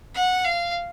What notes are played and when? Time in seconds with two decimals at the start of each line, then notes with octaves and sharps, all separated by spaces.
0.15 F#5
0.45 F5